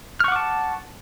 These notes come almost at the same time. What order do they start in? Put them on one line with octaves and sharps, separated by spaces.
F6 C#6 F#5 D6 A5